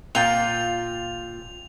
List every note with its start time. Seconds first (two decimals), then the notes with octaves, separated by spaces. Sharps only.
0.15 A#2 F4 G5 F7